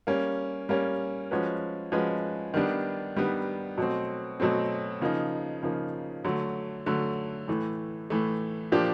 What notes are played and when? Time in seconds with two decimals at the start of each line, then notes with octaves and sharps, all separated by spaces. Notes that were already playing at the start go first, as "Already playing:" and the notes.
0.07 G3 A#3 C#4
0.69 G3 A#3 C#4
1.31 F3 G#3 C#4 F#4 B4
1.92 F3 G#3 C#4 F#4 B4
2.54 D#3 G3 B3 D4
3.16 D#3 G3 B3 D4
3.78 B2 F#3 A3 C4
4.40 B2 F#3 A3 C4
5.01 C#3 F3 A#3 D#4
5.63 C#3 F3 A#3 D#4
6.24 D3 F#3 A3
6.86 D3 F#3 A3
7.48 A2 E3 A3
8.10 A2 E3 A3
8.72 A#2 F3 A#3 D4 G4